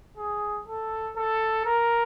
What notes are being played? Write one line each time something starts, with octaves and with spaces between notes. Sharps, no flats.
G#4
A4
A4
A#4